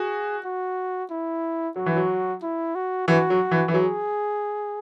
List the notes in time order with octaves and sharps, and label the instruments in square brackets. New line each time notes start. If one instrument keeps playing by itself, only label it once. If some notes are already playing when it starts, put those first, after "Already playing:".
Already playing: [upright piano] F#4 [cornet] G#4
[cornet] F#4
E4
[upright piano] F#3 [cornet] F#4
[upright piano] E3
F#3
[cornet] E4
F#4
[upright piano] E3 [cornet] F#4
[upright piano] F#3
E3
E3
[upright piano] F#3 [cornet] G#4